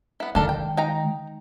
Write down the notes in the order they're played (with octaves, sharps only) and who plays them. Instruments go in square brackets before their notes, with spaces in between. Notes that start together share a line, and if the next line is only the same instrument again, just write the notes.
[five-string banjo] B3 E4
[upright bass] D#3 G#3 [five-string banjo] D4 A4 A#4
[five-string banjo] G5
D#4 G5 A#5